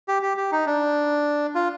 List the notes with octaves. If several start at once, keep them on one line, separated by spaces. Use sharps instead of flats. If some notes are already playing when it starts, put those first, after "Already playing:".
G4
G4
G4
D#4
D4
F4